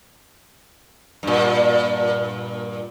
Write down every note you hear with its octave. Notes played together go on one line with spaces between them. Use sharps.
G2 A#2